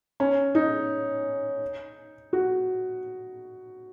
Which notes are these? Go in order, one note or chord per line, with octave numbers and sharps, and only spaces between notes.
C#4
D#4
F#4